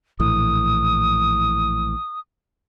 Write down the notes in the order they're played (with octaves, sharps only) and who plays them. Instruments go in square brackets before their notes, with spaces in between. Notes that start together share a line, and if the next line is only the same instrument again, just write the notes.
[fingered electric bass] A#1 A2 E3 [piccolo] D#6